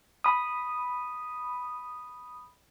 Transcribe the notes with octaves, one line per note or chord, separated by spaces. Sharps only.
B5 D#6